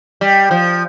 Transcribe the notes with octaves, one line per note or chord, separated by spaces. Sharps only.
G3
F3